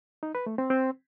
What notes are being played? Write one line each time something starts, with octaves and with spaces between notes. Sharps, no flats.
D#4
B4
A3
C4
C4